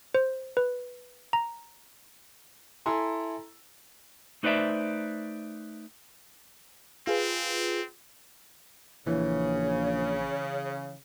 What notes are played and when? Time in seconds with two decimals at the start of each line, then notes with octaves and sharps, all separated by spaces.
0.15 C5
0.57 B4
1.33 A#5
2.86 E4 A4 G#5 A#5 C6
4.43 A3 D#4 B4 C5 D5 E5
7.07 C4 F4 G#4 B4
9.07 A#1 C#3 E3 C#5